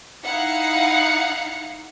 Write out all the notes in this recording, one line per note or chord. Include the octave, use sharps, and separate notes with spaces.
D#4 E4 F5 F#5 C#7